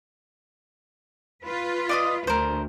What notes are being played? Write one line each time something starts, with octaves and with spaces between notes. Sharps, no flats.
F4 B4
D5 D#5 D#6
D2 A#4 C5